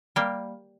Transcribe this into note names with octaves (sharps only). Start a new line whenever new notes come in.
G3 A#3